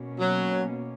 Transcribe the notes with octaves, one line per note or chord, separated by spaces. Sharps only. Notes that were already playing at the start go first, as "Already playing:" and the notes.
Already playing: B2 A#3 C#4
F#3